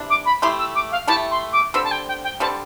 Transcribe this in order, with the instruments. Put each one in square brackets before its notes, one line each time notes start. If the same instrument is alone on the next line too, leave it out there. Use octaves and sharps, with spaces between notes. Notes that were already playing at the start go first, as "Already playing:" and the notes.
Already playing: [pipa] C3 E3 D4
[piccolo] D6
B5
[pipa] A3 E4 G4 [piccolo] C6
[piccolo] E6
D6
F5
[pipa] A3 E4 G4 [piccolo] A5
[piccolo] C6
D6
[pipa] D3 G3 C4 [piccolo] E6
[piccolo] A5
G5
G5
G5
[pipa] D3 G3 C4 [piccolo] A5